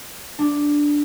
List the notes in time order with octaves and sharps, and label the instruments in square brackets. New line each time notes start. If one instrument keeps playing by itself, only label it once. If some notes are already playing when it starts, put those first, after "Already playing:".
[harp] D4